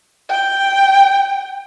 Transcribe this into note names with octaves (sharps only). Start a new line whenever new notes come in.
G5